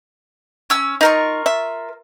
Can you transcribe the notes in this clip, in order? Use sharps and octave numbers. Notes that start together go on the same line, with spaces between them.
C#4 E6
D#4 F4 A#4 C#6
E5